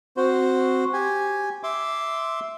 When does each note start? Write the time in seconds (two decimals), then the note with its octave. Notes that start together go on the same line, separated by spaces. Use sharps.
0.17 C4 F#4 C5
0.93 G4 G#5
1.63 E5 C6 D6